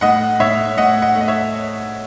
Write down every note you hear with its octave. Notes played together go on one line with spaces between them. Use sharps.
A2 D#5 F#5
A2 C#5 E5
A2 D#5 F#5
D#5 F#5
A3
D#5
C#5 E5